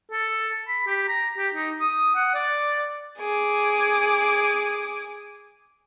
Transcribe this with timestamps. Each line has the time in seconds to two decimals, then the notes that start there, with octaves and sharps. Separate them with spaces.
0.11 A4
0.68 B5
0.87 G4
1.08 A#5
1.38 G4
1.54 D#4
1.80 D#6
2.16 F#5
2.35 D5
3.19 G#4 D6